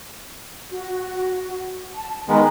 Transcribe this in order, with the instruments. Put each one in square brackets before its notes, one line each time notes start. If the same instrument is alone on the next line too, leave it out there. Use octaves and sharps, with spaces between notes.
[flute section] F#4
A5
[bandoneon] D#3 G#3 B3 [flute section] G#5 A#5